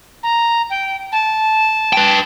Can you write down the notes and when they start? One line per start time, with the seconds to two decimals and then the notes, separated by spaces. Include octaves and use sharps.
0.23 A#5
0.70 G5
1.12 A5
1.93 B4 G5